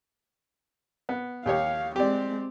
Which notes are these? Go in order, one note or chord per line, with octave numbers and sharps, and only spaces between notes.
B3
D#2 G4 C#5 F5
G#3 C4 G4 D5